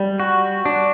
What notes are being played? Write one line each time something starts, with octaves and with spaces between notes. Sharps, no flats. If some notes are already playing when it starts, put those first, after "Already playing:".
Already playing: G3
F#4
D4